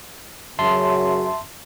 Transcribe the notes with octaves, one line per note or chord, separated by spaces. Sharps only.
F#2 C#3 F#3 E5 A5 C6